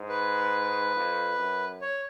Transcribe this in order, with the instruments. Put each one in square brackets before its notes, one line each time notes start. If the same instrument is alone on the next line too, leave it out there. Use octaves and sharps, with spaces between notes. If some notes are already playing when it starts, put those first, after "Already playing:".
Already playing: [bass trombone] G#2
[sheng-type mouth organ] B4
[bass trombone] F2
F#2
[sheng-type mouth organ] C#5